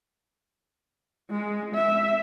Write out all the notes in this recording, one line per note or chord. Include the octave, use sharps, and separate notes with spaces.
G#3
E5